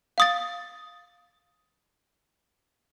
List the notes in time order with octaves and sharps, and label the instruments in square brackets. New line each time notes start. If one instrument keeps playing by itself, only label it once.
[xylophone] F5 D#6 A6